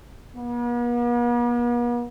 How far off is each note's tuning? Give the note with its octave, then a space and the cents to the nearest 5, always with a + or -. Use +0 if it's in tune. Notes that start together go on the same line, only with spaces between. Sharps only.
B3 -45